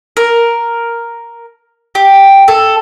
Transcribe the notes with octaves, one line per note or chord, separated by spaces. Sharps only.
A#4
G4
A4